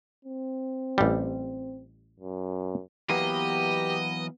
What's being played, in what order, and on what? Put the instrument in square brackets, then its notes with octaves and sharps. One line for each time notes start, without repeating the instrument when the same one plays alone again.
[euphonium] C4
[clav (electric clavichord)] A1 G3
[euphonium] F#2
[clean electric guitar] E3 F#3 A#3 [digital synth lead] B3 [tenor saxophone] G4 [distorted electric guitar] D#5